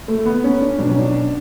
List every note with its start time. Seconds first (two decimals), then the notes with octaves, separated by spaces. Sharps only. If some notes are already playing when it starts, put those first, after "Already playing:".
0.08 A3
0.25 B3
0.44 C#4
0.61 D4
0.78 B1 B2 F#3 D4
0.89 C#4
0.99 D4